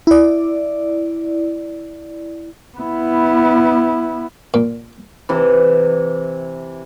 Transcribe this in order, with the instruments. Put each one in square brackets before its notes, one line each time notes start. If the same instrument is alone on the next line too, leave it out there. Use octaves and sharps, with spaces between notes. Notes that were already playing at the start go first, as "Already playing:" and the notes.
[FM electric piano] E4 D5
[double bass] B3 E4
[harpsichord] A#2
[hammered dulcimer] C3 E3